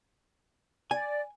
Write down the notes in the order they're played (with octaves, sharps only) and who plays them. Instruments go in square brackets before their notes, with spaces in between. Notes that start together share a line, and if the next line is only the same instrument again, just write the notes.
[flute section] D5 [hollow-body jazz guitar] G#5